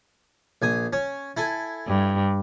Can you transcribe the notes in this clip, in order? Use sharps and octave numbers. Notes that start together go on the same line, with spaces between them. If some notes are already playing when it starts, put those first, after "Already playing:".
A#1 G#5 D#6
C#4
E4 A4 G#5
G2